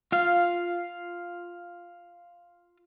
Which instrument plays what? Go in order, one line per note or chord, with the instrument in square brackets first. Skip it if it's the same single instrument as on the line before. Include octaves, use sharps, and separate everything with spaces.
[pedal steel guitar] F4 F5